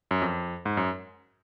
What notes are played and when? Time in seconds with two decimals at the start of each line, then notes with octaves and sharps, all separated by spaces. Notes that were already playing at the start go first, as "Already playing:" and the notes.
0.11 F#2
0.22 F2
0.65 G#2
0.77 F#2